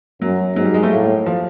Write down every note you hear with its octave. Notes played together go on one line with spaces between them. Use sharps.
F#2 F#3
G#2 F#3
G3
G#3
A3
A2 A#3
F3